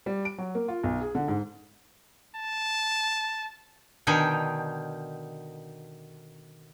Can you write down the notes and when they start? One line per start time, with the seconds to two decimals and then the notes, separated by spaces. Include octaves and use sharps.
0.06 G3
0.25 D7
0.38 F#3
0.55 A#3
0.68 F4
0.84 B1
1.01 G#4
1.15 D3
1.28 G#2
2.35 A5
4.07 B2 D3 D#3 G5 G#5